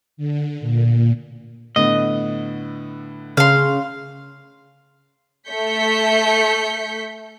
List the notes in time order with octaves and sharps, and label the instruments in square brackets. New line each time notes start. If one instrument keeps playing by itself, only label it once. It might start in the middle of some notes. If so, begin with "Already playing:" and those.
[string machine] D3
A#2
[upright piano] A2 D3 B3 [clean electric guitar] D#5
[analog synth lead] C#3 [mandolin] F5 C6
[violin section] A3 G6 B6 C#7